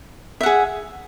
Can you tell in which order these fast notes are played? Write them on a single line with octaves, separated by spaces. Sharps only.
E5 F#5 G#4